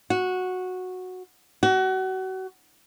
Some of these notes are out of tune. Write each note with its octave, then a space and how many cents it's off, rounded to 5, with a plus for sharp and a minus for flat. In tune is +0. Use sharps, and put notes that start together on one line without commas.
F#4 -10
F#4 +30